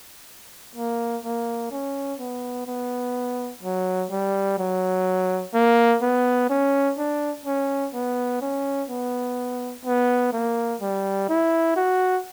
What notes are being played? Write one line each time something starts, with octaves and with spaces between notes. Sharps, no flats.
A#3
A#3
C#4
B3
B3
F#3
G3
F#3
A#3
B3
C#4
D4
C#4
B3
C#4
B3
B3
A#3
G3
E4
F#4